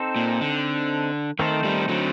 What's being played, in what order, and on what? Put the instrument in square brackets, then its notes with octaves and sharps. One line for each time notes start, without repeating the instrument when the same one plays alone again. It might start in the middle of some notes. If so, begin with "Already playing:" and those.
Already playing: [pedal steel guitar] C4 D#4 A4 C5
[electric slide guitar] A#2
D3
[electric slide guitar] D#3 [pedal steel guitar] A3 C4 D#4 A4 C5
[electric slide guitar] D#3 G3
D3 F#3